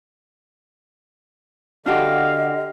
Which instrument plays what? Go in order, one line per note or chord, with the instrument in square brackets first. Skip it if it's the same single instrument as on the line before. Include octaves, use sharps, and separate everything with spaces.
[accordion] D3 [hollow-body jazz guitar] D4 F#4 G4 [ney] D#5 [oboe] F5